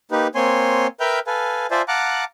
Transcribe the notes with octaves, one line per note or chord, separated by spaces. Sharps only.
A#3 D#4 G4 B4
A#3 C4 C#5 G#5 C6
A#4 B4 E5 G5 F6 G6
A4 B4 F5 G#5
F4 C5 D5 E5 G#5 A5
F5 F#5 A5 A#5 D6 F#6